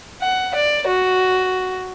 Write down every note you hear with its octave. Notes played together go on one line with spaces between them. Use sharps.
F#5
D5
F#4